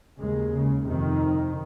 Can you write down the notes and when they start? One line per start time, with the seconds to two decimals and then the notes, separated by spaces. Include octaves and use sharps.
0.19 D#2 C#3 G#3
0.52 C#3
0.86 F2 C3 D#3